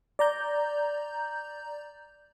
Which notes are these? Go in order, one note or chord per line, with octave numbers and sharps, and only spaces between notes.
D5 A#5 G6